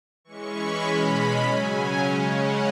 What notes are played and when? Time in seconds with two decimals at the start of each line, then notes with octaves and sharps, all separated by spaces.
0.24 E3 G#3 C#4 C#6
0.54 B5
0.84 B2 G#3 C#4 B5
1.42 C#3 F#3 C#4 G#5
2.01 C#3 G#3 C#4
2.31 F#5